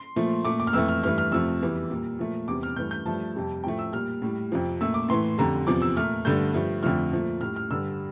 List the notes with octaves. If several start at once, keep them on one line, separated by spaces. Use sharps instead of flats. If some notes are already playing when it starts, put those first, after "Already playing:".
Already playing: C6
A#2 F3 A3
A#2 A3 D6
D6
F6
F2 E3 A3 E6
F6
G2 E3 A3 F6
F6
F2 C3 F3 A3 E6
E2 E3 G3
A#2 G3
A#2 F3 A3
E2 C3 G3 D6
F6
G2 E3 A3 G6
G6
G2 F3 A3 A5
F2 C3 G3
A2 F3 A3 G5
E6
A#2 G3 F6
A2 G3
F2 C3 F3
A#2 A3 E6
D6
A2 E3 A3 C6
F2 D3 G3 A#5
E2 C3 F3 D6
E6
A#2 A3 F6
G2 D3 A3 G6
G2 F3 A3
F2 D3 F3 A3 F6
A#2 F3 A3
A2 G3 F6
F6
G2 D3 G3 E6